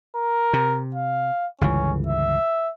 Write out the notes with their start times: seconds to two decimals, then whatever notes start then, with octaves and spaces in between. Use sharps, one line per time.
0.16 A#4
0.53 C3
0.95 F5
1.61 G1 C#2 E3 C#4
2.07 E5